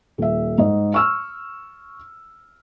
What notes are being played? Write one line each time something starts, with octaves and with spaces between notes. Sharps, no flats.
D#1 E5
G#2 D#5
C#6 E6 F6